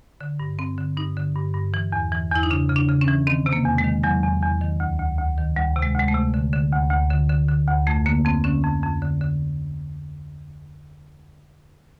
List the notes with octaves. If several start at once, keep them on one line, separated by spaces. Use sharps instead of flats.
D3
G2
G2 C4
D3
G2 D#4
D3
G2
G2
E3
E2
E3
E2 E4
D#4
C#3 D4
C#3
D4
C#3
C#4
E3
D#3 C4
C3
A#3
E2
G#3
D#3
E2 F#3
E2
E2
D#3
D2
D2
D2
D#3
D2 G3
C3
G#3
D2 G#3
A3
C3
D3
D3
D2
D2
D3
D3
D3
D2
F2 A3
D3 A#3
F2 C4
D3 C#4
F2
F2
D3
D3